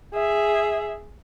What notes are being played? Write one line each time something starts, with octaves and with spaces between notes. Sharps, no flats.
G#4 E5